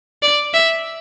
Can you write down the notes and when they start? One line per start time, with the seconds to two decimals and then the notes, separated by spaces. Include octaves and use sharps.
0.22 D5
0.53 E5